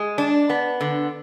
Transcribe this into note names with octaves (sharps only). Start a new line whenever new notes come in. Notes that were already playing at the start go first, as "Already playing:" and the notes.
Already playing: G#3
D4
B3
D3